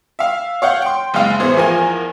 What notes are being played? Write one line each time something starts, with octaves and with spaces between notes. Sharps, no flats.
E5 F5
C#5 F5 F#5 G6
G5 C6
F#1 G#3 F5
A1 B3 G#4 C5
E2 F3 A#4 G#5